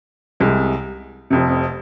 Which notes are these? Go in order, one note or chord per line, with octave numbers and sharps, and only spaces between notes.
C2 C3 G#3
F1 F2 C3